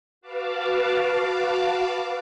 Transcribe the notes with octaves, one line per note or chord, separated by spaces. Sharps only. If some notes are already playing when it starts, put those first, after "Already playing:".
F#4 B4 F5 A5 D6